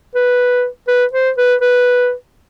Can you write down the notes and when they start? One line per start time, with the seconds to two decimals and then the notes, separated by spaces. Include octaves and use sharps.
0.15 B4
0.88 B4
1.13 C5
1.38 B4
1.61 B4